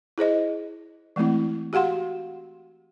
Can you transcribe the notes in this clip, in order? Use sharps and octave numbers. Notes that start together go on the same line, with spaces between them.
E4 G#4 C5 D#5
E3 G#3 A3 C4 E4
F#4 G4 F5 F#5 C6